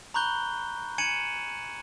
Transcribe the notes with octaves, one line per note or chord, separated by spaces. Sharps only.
A#5 B5 C#6 F#6 G6 G7
G#5 G#6 C#7 D#7 E7 F#7